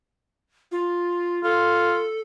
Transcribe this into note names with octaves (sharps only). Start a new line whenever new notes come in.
F4
F4 A4